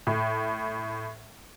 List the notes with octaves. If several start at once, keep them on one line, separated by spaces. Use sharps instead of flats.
A2